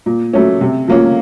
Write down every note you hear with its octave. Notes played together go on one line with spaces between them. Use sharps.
A#2
F#3 A3 C#4
C3
F3 A#3 C#4 F4